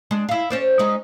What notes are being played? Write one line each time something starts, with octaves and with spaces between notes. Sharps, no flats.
G#3 D4
E4 F5
C#4 C5 D5
G#3 C#4 D#4